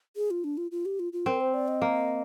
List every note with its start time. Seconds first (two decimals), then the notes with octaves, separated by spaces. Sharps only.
0.16 G#4
0.31 F4
0.44 D4
0.57 F4
0.71 F4
0.86 G4
0.99 F4
1.13 F4
1.26 C4 A#4
1.40 C5
1.54 D5
1.68 D#5
1.82 A#3